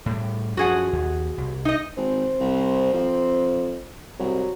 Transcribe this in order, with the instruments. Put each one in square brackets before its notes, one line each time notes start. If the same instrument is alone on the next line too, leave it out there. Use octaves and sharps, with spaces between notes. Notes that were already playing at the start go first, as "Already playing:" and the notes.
[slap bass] A2 G3
[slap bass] F#2 F3 [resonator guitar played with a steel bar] F#4 G#4 F#5
[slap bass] D#2
C2
[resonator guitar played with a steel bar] D#4 D#5
[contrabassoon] G#1 [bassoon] C4
[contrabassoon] C2
F2
[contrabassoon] C2 [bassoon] F#3